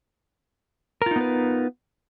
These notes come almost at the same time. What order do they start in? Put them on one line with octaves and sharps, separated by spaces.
A#4 F4 D#4 B3 B4